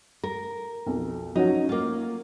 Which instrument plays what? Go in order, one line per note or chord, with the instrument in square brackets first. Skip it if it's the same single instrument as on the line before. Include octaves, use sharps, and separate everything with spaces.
[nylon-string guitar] A#4
[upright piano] B1 F2
[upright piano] F#3 C#4 F#4 [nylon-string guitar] D#4
[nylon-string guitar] A#3 F4